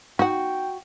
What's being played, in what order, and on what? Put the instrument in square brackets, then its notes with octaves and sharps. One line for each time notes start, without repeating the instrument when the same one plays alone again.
[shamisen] D#4 F#5 [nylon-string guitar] F#4 [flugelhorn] G5